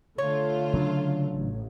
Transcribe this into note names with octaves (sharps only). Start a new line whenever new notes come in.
D3 A3 F4 C#5
C#3 F#3 D4
A1